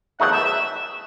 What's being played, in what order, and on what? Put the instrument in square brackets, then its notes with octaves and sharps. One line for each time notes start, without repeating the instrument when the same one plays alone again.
[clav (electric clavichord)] E2 D#3 F#3 A3 D#4 [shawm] F#5
[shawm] E5
E5